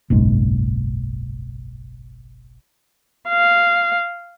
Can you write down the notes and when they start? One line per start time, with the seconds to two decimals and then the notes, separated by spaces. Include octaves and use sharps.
0.10 F#1 B1 G#2
3.29 F5